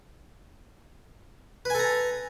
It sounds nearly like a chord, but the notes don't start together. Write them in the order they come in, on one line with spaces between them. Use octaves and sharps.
B4 G#5 A4 A#5